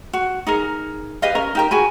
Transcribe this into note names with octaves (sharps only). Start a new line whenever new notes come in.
F#4
D#4 G#4 A#4
G4 B4 D#5 F5
C#4 A#4
D#4 G4 A#4
F#4 G#4 G#5 B5